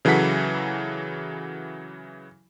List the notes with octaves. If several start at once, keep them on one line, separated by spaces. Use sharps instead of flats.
C#3 E3 F#3 A4 F#5 B6